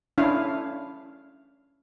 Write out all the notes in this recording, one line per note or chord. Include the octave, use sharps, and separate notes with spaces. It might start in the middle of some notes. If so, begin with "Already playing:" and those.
C#4 D4 E4 F5